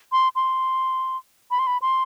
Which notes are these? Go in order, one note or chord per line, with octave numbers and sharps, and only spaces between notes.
C6
C6
B5
C6
B5
C6